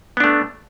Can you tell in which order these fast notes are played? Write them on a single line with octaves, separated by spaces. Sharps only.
B3 D4 A3